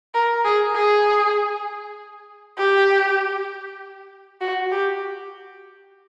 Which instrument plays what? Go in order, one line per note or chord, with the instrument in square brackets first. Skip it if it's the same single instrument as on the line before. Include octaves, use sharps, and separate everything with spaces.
[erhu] A#4
G#4
G#4
G4
F#4
G4